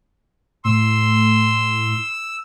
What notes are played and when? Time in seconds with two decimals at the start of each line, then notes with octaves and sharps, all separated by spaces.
0.65 A2 C6 E6